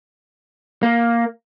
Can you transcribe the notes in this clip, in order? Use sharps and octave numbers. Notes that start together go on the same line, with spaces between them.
A#3